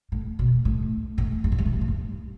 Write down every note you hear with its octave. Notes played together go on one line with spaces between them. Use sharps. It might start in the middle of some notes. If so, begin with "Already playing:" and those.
A2
B2
A2
A2
G2
A2
G2
A2
G2
A2
G2